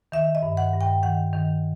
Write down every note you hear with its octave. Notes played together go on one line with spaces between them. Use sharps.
D#3 E5
D#5
G2
F#5
G2
G5
D#3 F#5
D#3